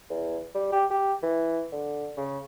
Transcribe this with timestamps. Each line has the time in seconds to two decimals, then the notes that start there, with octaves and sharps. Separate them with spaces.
0.10 E2
0.54 G3
0.72 G4
0.90 G4
1.23 E3
1.72 D3
2.17 C#3